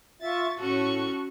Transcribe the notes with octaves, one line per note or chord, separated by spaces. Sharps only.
F4 E5 C#6 A6
A2 C#4 F#4 A4 C#6